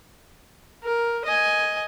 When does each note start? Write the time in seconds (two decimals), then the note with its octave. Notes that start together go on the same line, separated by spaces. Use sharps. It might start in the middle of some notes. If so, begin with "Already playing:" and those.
0.84 A#4
1.25 D#5 G#5